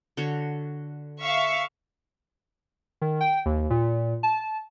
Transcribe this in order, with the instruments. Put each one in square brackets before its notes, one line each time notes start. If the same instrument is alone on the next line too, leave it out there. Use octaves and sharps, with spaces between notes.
[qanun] D3 F#4 C#5
[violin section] E5 F5 C#6
[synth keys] D#3
G5
D#2
A#2
A5